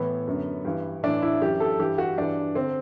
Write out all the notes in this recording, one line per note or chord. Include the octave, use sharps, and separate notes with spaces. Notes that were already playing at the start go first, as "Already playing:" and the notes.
Already playing: A2 E3 B3
F#2 D3
G2 E3
A2 E3 D4
E4
F#2 E3 G4
A4
G2 E3 G4
F#4
G2 E3 D4
D3 C4